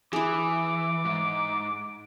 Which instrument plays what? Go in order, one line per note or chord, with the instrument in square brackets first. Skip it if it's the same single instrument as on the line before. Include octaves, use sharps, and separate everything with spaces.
[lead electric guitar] E3 [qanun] E4 G#4 [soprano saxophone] D6
[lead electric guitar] G#2